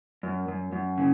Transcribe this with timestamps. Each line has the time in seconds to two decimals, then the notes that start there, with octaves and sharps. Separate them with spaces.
0.23 F#2
0.48 F#2
0.73 F#2
0.98 C#3